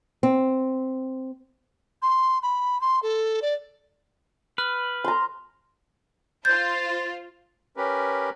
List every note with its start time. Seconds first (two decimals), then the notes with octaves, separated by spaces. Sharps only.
0.23 C4
2.02 C6
2.43 B5
2.81 C6
3.03 A4
3.42 D5
4.58 B4 F6
5.04 A#5 C6
6.45 F4 C5 G6 A6
7.77 C#4 G4 A#4 B4